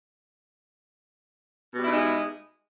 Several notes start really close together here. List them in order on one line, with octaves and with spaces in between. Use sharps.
B2 G3 E4 D#4 G#3